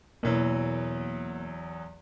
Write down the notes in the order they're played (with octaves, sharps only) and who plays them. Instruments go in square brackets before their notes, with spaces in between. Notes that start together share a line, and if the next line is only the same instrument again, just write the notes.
[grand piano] E2 E3 F#3 [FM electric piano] B2 A#3